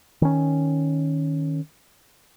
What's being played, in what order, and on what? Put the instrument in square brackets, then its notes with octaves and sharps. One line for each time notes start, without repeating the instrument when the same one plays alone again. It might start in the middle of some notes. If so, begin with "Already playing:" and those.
[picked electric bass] D#3 C#4